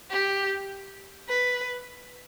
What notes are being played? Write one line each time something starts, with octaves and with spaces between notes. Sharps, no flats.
G4
B4